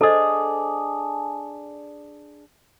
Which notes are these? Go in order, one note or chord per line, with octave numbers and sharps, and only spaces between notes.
D4 G#4 A4 C5 D#5